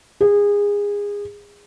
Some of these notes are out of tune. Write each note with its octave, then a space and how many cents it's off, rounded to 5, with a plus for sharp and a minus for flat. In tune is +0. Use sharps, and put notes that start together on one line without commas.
G#4 -25